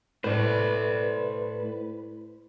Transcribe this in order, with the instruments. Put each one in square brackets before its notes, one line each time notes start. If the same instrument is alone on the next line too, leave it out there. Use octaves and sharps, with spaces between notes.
[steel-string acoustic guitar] A2 [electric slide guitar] B4 [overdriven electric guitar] C5 D5